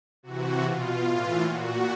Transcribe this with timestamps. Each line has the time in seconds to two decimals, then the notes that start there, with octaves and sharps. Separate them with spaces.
0.23 C3 E3 F#4
0.62 B2 F4
1.01 A2 E3 F4
1.41 A#2 F#4